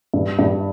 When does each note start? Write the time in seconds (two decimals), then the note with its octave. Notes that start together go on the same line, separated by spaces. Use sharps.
0.14 G2
0.39 G2